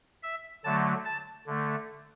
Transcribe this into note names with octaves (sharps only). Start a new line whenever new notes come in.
E5
D3 F#3 A3 A5
A5
D3 A3